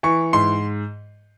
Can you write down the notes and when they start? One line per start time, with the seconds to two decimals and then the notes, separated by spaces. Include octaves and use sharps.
0.03 E3 C#6
0.33 G#2 C6